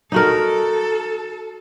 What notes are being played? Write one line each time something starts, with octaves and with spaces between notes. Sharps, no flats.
D#4 F#4 A4 A#4